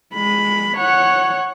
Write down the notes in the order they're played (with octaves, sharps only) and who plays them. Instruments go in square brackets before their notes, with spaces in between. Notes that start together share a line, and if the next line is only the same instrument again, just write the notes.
[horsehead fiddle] G#3 B5
C#5 F#5